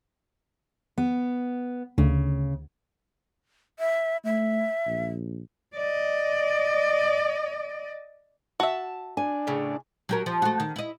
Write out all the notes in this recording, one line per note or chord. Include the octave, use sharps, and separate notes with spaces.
B3
D2 C#3
E5
A3 E5
A#1
D5 D#5
F#4 E5 A5
D4 G#5
A2 C#3
F#3 G4 A#4
F3
A3 F#4
D#3
E4 D#5